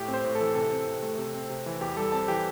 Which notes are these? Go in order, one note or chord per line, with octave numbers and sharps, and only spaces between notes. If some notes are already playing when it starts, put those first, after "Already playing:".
Already playing: A2 G4
C4
C5
A2
E3 A4
C3 A4
C4
C3
A3
C3
C4
C3
E3
E2 G4
G3 A4
C4 A5
E3 G4